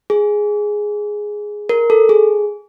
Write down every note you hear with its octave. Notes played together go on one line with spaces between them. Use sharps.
G#4
A#4
A4
G#4